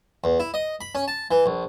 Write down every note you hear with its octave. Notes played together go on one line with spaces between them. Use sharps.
E2
E4
D#5
B5
C#4
A5
E3
A#1